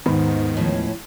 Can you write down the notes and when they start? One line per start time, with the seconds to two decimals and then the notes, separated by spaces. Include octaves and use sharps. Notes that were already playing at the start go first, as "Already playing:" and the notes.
0.06 D#2 G#2 D#3 G#3 B3
0.57 A2 F3 C#4